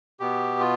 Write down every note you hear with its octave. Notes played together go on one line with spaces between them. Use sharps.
B2 B3 G4
F4